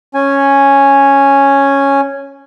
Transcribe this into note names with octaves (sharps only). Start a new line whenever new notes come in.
C#4 G#5